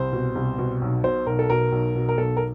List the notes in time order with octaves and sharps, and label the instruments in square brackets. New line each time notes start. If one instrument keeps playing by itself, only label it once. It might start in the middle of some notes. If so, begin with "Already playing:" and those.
Already playing: [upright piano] C2 C5
B2
C2
B2
B1
B2 C5
B1 A#4
A4
B2 A#4
B1
B2
A#4
B1 A4
A#4